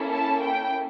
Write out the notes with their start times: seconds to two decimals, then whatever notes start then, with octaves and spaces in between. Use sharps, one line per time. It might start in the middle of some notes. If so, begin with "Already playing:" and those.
Already playing: A#3 C#4 E4 A4
0.11 A5
0.41 G5